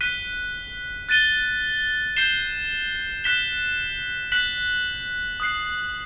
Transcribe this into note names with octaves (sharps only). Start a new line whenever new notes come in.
F#6 B6 D#7 G7
F#6 A6 D#7 G7
G6 C7 E7 G7
F#6 B6 E7 G7
F#6 B6 F#7
D#6 F#6 C7